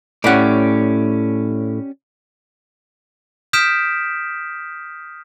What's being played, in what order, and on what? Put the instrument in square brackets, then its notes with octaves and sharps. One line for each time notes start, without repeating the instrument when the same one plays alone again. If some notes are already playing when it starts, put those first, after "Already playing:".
[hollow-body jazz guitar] A2 F#5 [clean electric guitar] C#4 G4 D5
[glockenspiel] D#6 F6 G6 B6 D7 E7